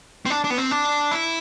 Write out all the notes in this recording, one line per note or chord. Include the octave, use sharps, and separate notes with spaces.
C4
D4
D4
B3
C4
D4
E4